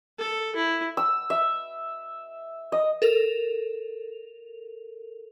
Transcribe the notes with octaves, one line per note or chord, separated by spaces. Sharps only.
A4
E4
E6
E5
D#5
A4 A#4 F7